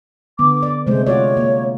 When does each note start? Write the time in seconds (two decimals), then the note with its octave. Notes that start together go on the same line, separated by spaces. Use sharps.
0.39 D3 B3 D6
0.63 D5
0.87 C3 G#3 A3 C5
1.07 F4 F#4 C#5 D5
1.37 A#3